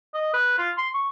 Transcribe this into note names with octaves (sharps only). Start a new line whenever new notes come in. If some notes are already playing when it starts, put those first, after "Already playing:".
D#5
B4
F4
C6
C#6